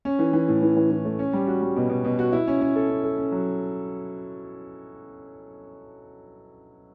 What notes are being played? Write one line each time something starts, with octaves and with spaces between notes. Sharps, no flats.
C#4
E3
E3
A2
E3
E3
E3
A3
C#4
G3
F#4
G3
B2
B2
B2
F#4
E4
C#4
C#4
A4
C#4
A4
C#4
F#3